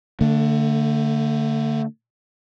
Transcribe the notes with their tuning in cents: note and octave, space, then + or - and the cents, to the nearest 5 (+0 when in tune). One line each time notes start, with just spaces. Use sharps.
D3 +0 A3 +35